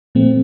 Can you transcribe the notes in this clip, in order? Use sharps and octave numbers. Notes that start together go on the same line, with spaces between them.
A#2 F3 A3 C4